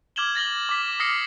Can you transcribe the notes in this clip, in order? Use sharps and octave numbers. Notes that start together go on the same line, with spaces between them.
D6 F6 G#6 E7 F#7 G7
A6 A#6 F#7 G7
D6 B6
D#6 F6 A#6 C7 C#7